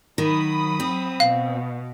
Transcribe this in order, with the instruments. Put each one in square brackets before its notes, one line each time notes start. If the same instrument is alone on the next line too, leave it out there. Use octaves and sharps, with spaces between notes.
[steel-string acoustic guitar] D#3 [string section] F#3 B5 D#6
[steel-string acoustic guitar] C4
[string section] B2 [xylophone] F5